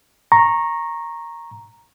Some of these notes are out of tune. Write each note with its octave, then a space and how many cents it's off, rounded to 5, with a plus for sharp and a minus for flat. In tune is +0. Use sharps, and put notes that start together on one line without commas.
A#5 +0 C#6 -20